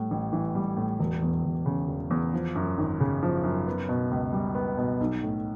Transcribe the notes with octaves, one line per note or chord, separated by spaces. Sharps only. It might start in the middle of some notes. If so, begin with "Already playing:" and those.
Already playing: A2 G3
A1
E3
G3
A2
E1
E2
E1
C#3
E1
E2
F3
F#2
G#1
C#3
F3
F#2
B3
B2
C#2
G3
B3
B2
B1
A2